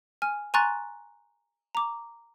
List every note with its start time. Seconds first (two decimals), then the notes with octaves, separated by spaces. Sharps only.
0.22 G#5 F6
0.54 G#5 A#5 C6 C#6 F#6 A6
1.75 A#5 D6